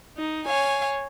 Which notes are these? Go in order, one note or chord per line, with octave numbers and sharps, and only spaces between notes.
D#4
C#5 F5 G#5